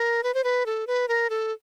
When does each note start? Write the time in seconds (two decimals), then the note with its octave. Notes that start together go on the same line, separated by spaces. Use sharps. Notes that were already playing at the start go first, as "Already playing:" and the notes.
Already playing: A#4
0.23 B4
0.34 C5
0.44 B4
0.66 A4
0.87 B4
1.08 A#4
1.30 A4